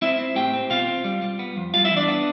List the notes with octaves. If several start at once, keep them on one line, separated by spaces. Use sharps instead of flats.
C4 E4 E5
C4
A2 G4 G5
C4
B2 F4 F5
C4
G3
G3
B3
F2
G3 F4 F5
E4 E5
E2
D4 D5
B3